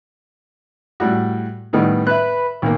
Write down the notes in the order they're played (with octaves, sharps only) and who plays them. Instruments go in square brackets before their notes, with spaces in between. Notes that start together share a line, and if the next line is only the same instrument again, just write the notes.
[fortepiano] A2 G3 F#4
[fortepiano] A2 D#3 G3 [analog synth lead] B3
[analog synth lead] B4 [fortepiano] E5 F#6
[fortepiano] B1 A#3 [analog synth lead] D#3